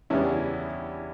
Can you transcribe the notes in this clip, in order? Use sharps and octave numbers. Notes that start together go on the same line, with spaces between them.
E2 C#3 G3 B3 C#4 E4